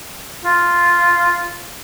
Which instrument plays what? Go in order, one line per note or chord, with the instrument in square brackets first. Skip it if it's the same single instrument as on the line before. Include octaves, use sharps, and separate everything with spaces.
[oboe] F4